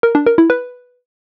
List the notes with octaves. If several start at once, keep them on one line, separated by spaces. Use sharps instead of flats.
A#4
D4
A#4
E4
B4